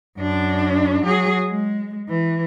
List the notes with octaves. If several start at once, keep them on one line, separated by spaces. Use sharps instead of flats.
F#2 D4
F#3 G#4
G#3
E3